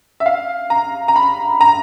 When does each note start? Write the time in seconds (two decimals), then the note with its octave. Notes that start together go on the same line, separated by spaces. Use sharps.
0.20 E5
0.26 F5
0.70 A#5
1.08 A#5
1.16 B5
1.61 A#5